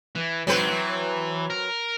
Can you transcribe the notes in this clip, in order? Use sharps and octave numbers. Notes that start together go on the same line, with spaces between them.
E3
G#2 E3 F#3 C4 B4
E3
A#4